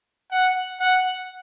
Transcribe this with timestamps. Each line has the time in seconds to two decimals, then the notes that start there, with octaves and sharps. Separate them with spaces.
0.31 F#5
0.80 F#5